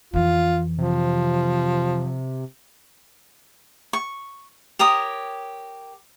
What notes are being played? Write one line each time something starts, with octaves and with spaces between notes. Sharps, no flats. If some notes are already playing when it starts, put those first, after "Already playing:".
F2 E3 F4
C3 F3
C#6
G4 A#4 C#5 D#6